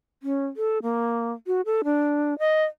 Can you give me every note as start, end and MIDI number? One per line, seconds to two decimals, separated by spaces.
0.23 0.46 61
0.57 0.78 69
0.83 1.33 58
1.47 1.61 66
1.66 1.82 69
1.84 2.37 62
2.39 2.64 75